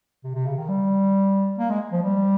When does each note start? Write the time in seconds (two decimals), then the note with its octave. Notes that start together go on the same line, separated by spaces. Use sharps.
0.24 C3
0.35 C3
0.46 C#3
0.57 D#3
0.69 G3
1.58 A#3
1.70 G#3
1.92 F3
2.03 G3